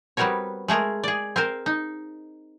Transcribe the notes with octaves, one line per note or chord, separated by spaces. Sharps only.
G3 B3 C4 F#4 A#4 C#5
G#3 A3 G#4 A#4
G#4 D5
C4 A#4 C5
D#4